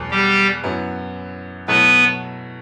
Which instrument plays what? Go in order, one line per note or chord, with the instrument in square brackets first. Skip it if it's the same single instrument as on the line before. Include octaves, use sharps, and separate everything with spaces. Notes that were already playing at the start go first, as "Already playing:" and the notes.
Already playing: [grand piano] E2 B2 F#3 A3
[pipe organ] G3 G4
[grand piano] F#2 F#3 B3 E4
[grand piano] B2 F#3 A3 E4 [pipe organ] B3 B4